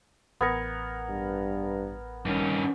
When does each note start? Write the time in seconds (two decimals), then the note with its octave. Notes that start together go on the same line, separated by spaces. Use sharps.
0.41 A1 B3 A#4 G#6 C#7
1.09 G2
2.25 G2 D#3 C#4